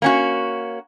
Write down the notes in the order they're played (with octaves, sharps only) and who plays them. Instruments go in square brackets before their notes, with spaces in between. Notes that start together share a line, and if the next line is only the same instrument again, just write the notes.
[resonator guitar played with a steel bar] A#3 C#4 F#4